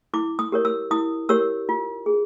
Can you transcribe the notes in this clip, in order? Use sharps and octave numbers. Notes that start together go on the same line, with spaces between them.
E4 D6
D#6
G4 A#4 C#5
E6
E4 D#6
G4 A#4 C#5 E6
F4
G#4